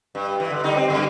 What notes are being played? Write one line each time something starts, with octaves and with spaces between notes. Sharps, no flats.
G2
G2 E3
D3
D3 G3 D#4
C4
F#2 D3